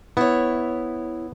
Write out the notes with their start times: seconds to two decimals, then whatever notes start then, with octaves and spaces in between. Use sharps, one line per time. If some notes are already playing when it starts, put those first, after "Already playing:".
0.17 B3 E4 C#5